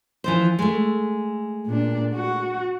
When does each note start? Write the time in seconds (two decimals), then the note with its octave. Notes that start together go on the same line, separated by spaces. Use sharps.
0.24 E3 F3 C5
0.59 G#3 A3
1.66 A#2 D4
2.14 F#4